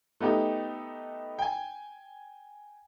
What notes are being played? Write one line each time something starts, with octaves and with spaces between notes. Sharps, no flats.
A3 B3 D#4 G4
G5 G#5